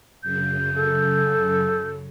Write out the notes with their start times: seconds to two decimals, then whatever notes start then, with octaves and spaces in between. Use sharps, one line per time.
0.23 F#2 C#3 G6
0.76 A4